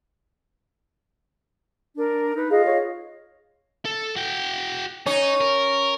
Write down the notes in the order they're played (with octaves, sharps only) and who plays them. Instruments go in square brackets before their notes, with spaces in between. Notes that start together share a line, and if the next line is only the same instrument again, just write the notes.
[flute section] D4 A#4
D#4 B4
[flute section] F4 D#5 F5 [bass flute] G#4
[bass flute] C#5
[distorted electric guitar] A4
F#4 G5
[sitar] C#4 [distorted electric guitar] D#4
[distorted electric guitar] A#4